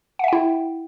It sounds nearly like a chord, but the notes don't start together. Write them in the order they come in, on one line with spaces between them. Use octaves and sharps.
F#5 E5 G5 E4